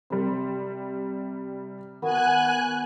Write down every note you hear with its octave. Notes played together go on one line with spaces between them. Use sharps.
C3 G3 C5
D#3 B3 F#4 G#5 F#6